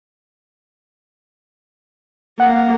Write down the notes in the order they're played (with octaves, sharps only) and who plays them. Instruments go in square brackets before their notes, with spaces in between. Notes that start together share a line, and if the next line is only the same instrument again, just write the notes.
[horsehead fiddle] A#3 [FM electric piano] F#5